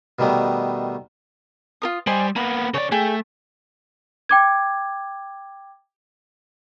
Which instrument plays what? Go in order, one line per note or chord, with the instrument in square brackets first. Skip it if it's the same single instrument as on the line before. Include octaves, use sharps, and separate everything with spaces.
[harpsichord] B2 D#3 G3 A3 B3
[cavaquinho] F4 A#4 D#6
[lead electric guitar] G3 [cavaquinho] C5 D#5 G#5
[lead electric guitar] A#3 B3 [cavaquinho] B5
[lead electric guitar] C#3 D5 [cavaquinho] C#5
[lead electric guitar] A3 [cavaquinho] G#4 G5
[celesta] G5 D6 G#6